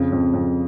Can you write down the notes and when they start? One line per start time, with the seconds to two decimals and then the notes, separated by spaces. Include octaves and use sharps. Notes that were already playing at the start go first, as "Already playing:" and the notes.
Already playing: F2 C#3
0.12 F2
0.34 F2